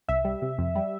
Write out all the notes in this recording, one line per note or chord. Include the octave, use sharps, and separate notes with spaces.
C2 E5
G3
C3
F2
G3